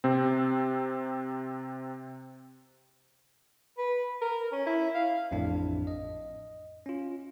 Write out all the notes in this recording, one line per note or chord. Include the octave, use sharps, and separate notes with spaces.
C3 C4
B4
A#4
C#4
E4
F5
A1 F2 A2 D4
D#5
C#4 F4